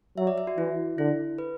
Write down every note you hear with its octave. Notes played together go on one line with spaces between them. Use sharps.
F#3 E5
D5
E5
F#4
E3 E4
D3 E4
B4